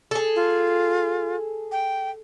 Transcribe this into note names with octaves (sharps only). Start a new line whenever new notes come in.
G#4 A4
F4
G5